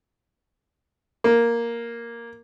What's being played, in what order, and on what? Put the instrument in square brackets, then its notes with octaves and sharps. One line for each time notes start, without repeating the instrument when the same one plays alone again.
[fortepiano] A#3